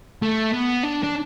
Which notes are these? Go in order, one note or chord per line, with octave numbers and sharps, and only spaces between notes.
A3
B3
D4
D4